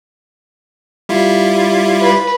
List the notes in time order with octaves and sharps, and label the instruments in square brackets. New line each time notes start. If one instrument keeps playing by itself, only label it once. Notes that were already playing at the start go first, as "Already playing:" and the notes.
[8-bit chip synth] G3 E4 F4
[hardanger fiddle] B4